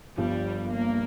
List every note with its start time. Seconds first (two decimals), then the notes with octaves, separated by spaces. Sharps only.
0.17 G1 G2 F3 G3 D4
0.70 A#3